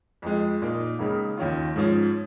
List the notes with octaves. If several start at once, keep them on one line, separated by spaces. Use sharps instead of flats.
F2 F3 G#3
A#2 A#3 D#4
C#2 C#3 A#3 D#4
D#2 D#3 C#4 F4
G#2 F3 C#4